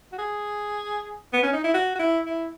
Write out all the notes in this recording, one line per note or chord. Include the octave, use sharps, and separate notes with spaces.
F#4
G#4
B3
C#4
D#4
E4
F#4
F#4
E4
E4